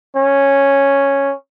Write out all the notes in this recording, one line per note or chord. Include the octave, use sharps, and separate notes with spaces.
C#4